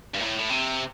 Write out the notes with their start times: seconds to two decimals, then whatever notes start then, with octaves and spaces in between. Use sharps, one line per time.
0.14 G2
0.19 A2
0.39 A2
0.50 C3